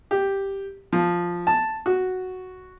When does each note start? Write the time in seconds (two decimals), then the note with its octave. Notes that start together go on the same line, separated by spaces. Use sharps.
0.11 G4
0.93 F3
1.47 A5
1.86 F#4